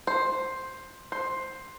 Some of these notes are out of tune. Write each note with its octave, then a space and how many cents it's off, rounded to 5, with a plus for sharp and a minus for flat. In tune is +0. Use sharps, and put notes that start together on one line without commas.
C5 +5
C5 +10